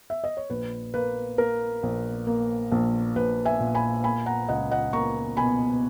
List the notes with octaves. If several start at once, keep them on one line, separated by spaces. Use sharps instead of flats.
E5
D#5
C#5
A#1 B4
A#3 B4
A#3 A#4
A#1
A#3
A#1
A#1 B4
E5 G#5
A#2
G#5 B5
A#3 G#5 B5
F#5 A#5
C#2 D#5 F#5
D#5 F#5
A#3 A#5 C#6
B2 G#5 B5